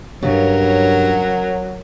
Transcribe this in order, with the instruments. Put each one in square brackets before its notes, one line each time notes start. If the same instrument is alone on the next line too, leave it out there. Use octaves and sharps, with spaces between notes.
[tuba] G2 [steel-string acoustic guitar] C#3 [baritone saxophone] F#3 [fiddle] C#4 A#4